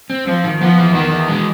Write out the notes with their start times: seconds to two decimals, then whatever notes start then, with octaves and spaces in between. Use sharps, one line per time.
0.10 C4
0.26 F3 C4
0.44 D#3
0.61 F3 B3
0.78 E3
0.94 D#3 B3
1.11 E3
1.28 G#3